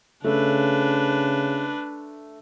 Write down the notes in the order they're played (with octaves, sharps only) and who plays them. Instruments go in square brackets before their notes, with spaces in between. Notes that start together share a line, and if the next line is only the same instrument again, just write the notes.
[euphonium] C#3 [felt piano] A3 [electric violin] D4 B4